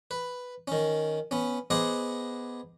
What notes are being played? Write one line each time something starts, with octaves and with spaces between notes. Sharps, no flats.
B4
D#3 C#4
B3 C#4
B3 G#4 C5 D#5 F#5 D6